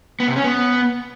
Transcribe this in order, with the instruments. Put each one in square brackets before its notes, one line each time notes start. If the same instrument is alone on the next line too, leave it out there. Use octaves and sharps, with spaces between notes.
[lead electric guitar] B3
C3
C#4
B3